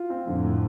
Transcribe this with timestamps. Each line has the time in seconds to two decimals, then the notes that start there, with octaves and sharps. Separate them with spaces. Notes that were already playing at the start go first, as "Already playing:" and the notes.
Already playing: F4
0.10 C4
0.27 F2 A2 D3
0.44 A3